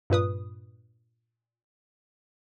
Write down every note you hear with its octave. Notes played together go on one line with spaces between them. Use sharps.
G2 A#2 B4 D#6